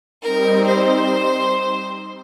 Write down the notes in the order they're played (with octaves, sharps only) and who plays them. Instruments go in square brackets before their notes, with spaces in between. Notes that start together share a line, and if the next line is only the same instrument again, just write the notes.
[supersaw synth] G3 C4 D#4 [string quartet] A#4
[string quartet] C5